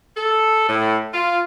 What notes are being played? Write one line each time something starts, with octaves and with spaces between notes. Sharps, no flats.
A4
A2
F4